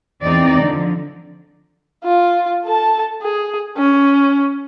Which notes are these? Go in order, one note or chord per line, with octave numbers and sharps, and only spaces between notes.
E2 C4 D#4 D5
D3 F3
F4
A4 A5
G#4
C#4